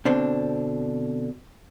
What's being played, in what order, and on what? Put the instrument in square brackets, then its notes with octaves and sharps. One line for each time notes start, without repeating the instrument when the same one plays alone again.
[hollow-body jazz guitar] B2 D3 C4 D4